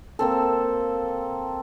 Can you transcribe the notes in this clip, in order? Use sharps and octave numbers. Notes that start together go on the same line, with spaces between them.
A#3 C4 A4